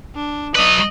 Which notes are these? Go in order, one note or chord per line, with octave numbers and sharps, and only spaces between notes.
D4
F#3 B4 D#5